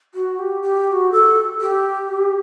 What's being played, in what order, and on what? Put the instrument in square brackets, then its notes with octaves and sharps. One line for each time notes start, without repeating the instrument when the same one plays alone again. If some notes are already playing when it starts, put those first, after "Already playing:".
[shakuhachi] F#4
G4
G4
G4
F#4
A4
G4